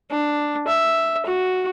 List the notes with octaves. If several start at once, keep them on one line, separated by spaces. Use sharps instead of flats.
D4
E5
F#4